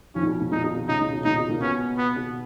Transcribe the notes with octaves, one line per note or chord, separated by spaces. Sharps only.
F2 F3 C#4
A#2
B2
A#2
A#2 D#4
B2
B2
C#2 C#3 D#4
A#2
B2
A#2 D#4
B2
A#2 A#3
B2 B3 C#4
B3
B2